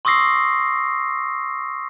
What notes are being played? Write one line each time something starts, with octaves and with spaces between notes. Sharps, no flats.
C6 C#6 D#6 E6 A#6 C7